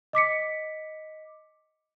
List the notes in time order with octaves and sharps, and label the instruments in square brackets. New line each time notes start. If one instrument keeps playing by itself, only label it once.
[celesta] D#5 D6 B6 C#7